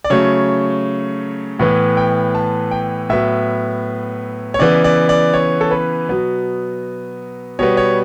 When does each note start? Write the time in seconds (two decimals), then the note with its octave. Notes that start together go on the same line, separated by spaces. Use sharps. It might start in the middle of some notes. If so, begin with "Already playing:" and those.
0.04 D5
0.10 C#3 F#3 A3 C#5
1.59 A2 E3 B3
1.97 G5
2.35 A5
2.71 G5
3.09 A2 F#3 B3 E5
4.54 C#5
4.59 C#3 E3 B3 D5
4.84 D5
5.09 D5
5.34 C#5
5.61 A4
5.71 B4
6.09 B2 F#3 B3
7.59 B2 G3 B3 C#5
7.77 C#5